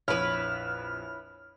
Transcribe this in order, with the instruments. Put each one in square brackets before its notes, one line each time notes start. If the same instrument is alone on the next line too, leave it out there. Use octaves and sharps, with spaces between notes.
[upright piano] A#1 F2 [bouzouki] E4 B4 [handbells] C#5 [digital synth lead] F6